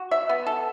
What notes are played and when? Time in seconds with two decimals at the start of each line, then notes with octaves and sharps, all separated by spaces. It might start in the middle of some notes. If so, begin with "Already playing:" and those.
Already playing: F#4
0.11 E5
0.29 B3
0.47 A4